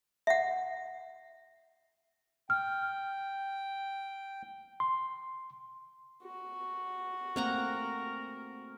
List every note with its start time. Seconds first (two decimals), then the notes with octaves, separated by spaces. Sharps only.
0.27 E5 F#5
2.50 G5 F6
4.80 C6
6.24 F#4
7.36 A3 A#3 C4 A#4 F#5 A#5